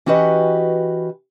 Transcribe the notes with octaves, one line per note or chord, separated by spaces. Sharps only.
E3 C#4 F#4 G4 B4 D#5